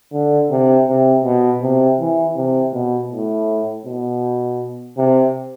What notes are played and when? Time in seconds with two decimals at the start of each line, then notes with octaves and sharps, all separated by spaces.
0.12 D3
0.50 C3
0.88 C3
1.25 B2
1.62 C3
2.00 E3
2.36 C3
2.74 B2
3.11 A2
3.86 B2
4.97 C3